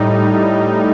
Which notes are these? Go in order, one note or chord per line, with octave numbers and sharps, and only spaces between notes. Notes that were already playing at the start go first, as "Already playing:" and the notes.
Already playing: A2 G3 D#4